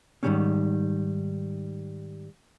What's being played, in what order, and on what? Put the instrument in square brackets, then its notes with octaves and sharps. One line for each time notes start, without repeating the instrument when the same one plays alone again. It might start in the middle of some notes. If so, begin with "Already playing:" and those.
[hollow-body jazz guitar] G#2 D#3 E3 G3 A#3 C#4